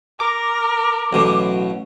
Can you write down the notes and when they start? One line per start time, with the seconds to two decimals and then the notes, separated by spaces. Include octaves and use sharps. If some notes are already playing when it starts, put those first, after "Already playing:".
0.20 A#4 D6
1.13 A1 B2 F#3